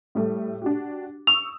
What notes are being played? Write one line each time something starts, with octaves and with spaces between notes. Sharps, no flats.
A2 G3 A3
D4 F#4 G4
C#6 D#6 E6 F7